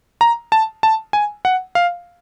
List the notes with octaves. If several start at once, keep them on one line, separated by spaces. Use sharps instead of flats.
A#5
A5
A5
G#5
F#5
F5